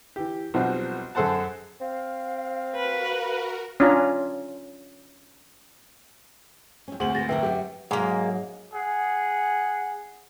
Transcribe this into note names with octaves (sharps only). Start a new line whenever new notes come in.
E3 G4
B1 F3 G3 C4 F#4
F#2 G#4 A4 C5 F#5 A5
C4 F5
F#4 A#4 B4
C#4 D4 F4 A#5
F2 C#4
D2 C4 G#4 C5 F#5 F#7
B3 F#4 A6 A#6
F2 D3 A#4 B4 E5 G5
F#2 F#3 C#4 G4
G#2 F#3 G#3 A#3 G#4 E5
G#4 F#5